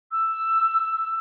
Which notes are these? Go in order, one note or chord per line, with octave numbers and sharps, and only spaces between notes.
E6